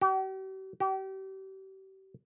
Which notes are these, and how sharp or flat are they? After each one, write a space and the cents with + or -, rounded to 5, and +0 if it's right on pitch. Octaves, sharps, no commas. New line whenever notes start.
G4 -45
G4 -35